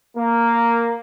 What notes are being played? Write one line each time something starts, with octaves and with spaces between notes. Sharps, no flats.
A#3